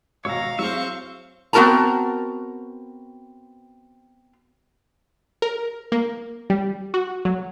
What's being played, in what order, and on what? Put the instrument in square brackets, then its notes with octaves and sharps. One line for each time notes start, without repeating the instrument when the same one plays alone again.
[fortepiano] G#1 B2 E6 [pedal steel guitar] C#5 A#5 [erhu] F5
[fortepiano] F#3 E4 G#4 [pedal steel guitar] C4 E5 [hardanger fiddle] C5 C#6
[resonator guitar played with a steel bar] B3 C4 F#4 A#4 A5 A#5
[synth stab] A#4
A#3
G3
F#4
F#3